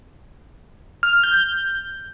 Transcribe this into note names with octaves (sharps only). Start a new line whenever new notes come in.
F6
F6
G6
G6